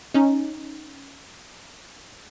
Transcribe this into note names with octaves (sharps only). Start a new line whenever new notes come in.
C#4 D#4